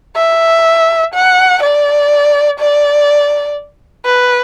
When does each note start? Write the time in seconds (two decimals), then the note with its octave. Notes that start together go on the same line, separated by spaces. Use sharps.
0.16 E5
1.14 F#5
1.62 D5
2.60 D5
4.06 B4